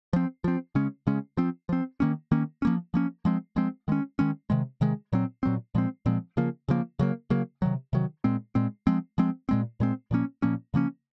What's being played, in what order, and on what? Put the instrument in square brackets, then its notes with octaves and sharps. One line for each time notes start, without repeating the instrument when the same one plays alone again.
[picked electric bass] F3 C4
F3 C4
C#3 G#3 C#4
C#3 G#3 C#4
F3 C4
F3 C4
D#3 A#3 C#4
D#3 A#3 C#4
F3 A#3 C#4
F3 A#3 C#4
F3 G#3 C4
F3 G#3 C4
D#3 G#3 C#4
D#3 G#3 C#4
C3 D#3 G#3
C3 D#3 G#3
A#2 F#3 C4
A#2 F#3 C4
A#2 F3 G#3 C4
A#2 F3 G#3 C4
C#3 F3 A#3
C#3 F3 A#3
C#3 F#3 A#3
C#3 F#3 A#3
C3 D#3 F#3
C3 D#3 F#3
A#2 G#3 C4
A#2 G#3 C4
F3 G#3 C4
F3 G#3 C4
A#2 G#3 C4
A#2 G#3 C4
A#2 F3 A#3 C#4
A#2 F3 A#3 C#4
C#3 F3 A#3 C#4